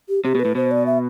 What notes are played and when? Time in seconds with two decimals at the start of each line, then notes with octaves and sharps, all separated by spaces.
0.09 G4
0.24 C3 G4
0.35 B2
0.40 B4
0.45 A2
0.55 B2 C5
0.71 D5
0.86 E5